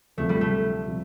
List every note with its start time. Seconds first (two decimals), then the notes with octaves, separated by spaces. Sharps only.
0.18 D2 C3 F3 A3
0.29 G3
0.41 A3
0.86 C3 F3